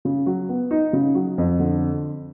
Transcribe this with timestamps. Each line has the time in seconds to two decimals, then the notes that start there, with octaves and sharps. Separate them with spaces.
0.05 C#3
0.26 F#3
0.49 B3
0.71 D#4
0.93 C#3
1.15 F#3
1.38 F2
1.59 D3